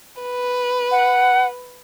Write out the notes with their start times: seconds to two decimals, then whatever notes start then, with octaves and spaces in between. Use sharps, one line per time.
0.22 B4
0.91 F#5